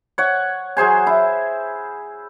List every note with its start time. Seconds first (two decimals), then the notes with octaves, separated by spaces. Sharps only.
0.18 C#5 F#5
0.77 F#3 G#4 C5 G#5
1.07 E4